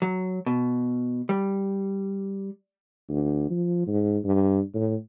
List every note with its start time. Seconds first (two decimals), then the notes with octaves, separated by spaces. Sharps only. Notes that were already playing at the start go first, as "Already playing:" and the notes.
0.02 F#3
0.46 B2
1.29 G3
3.09 D2
3.50 F3
3.87 G#2
4.24 G2
4.74 A2